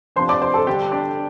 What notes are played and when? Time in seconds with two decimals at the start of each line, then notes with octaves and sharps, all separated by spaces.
0.16 C3 F3 D4 C5 C6
0.29 D5 D6
0.42 C5 C6
0.54 A4 A5
0.67 D3 G3 D4 G4 G5
0.92 D4 D5